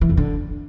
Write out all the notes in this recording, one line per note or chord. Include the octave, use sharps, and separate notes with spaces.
E3
F2
D3